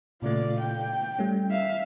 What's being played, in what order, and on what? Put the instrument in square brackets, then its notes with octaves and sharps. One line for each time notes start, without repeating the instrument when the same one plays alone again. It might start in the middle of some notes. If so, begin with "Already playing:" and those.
[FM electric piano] A#2 C#3 A3 [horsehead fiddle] F4 D5
[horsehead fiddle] G5
[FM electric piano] G3 A3 C#4
[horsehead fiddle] E5 F5